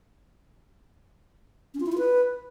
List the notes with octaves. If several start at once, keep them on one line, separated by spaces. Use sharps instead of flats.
C#4
F4
E4
F4
B4